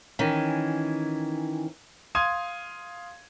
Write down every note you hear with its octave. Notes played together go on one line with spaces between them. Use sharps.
D#3 E3 C#4
F5 C6 D#6 G#6 D#7